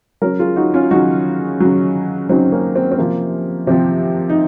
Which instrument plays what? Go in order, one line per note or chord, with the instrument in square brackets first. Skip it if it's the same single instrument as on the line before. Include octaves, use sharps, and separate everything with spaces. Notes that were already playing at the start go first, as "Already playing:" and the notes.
[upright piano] C#3 F#3 A#4 C#5
F4 G#4
D#4 F#4
C#4 F4
C#3 F#3 D#4 F#4
C#3 F#3
C#3 F#3 C4 D#4
A#3 C#4
C4
C4
C3 F3 A#3
C3 F3 C4
D#4